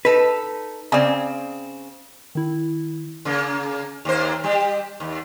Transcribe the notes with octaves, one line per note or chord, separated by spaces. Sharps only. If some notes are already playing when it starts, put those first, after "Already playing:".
D#4 A4 B4
C#3 C4 D5 G#5
D#3 E4
C#3 A#3
D#2 A#3 C5
G3 G4
D#2